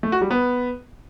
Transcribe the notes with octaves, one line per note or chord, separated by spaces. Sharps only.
A3
F#4
G3
B3